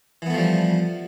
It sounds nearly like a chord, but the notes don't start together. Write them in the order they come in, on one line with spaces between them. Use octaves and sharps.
E3 B3 A3 F3 G3